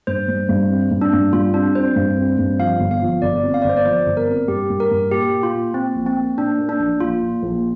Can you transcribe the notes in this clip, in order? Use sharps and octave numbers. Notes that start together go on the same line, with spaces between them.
G2 C5
G3
G2
C4
G2
D4
G2
G3 F4
C4 D4
C4 C5
G2
C4
G2
F3 F5
G1
F5
F3
G1 D5
C4
F5
G1 D5
C5
D5
F3 C5
G1
A#4
C4
G2 G4
G2
A#4
G2
A#2 G4
A#2
F4
A#2
A#2 C4
A#1
C4
A#3
A#2 D4
A#3
D4
A#1
A#1 F4
A#2
A#1